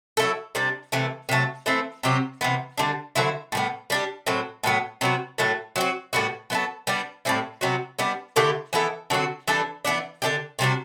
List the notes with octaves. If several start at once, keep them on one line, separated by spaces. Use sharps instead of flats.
F#3 A3 E4 A4
C3 G3 D4
C3 E3 A3
C3 F#3 A3
E3 A3 C4
C3 F#3 C4 G4
C3 E3 B3
D3 G3 D4
D3 F#3 C4 E4
A2 G3 B3
G3 D4 G4
A2 F#3 C4
A2 F#3 B3
C3 F#3 B3 F#4
A2 F#3 A3
F#3 C4 F#4
A2 G3 B3 F#4
F#3 B3 E4 A4
G3 B3 D4
A2 G3 C4 E4
C3 F#3 B3 F#4
G3 B3 D4
D3 A3 E4 G4
E3 B3 E4 A4
D3 F#3 C4 F#4
E3 G3 D4 A4
E3 G3 B3 D4
D3 G3 D4 G4
C3 G3 D4 F#4